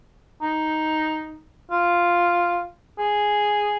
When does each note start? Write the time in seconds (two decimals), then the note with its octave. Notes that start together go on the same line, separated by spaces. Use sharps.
0.42 D#4
1.71 F4
2.99 G#4